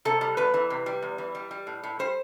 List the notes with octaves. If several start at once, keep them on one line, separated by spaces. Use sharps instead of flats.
C3 A4
G3
E2 B4
E3
C3
G3
E2
E3
G3
G3
A2
A2
G3 C5